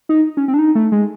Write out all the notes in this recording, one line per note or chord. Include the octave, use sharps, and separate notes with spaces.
D#4
C#4
C4
D4
D#4
A3
G#3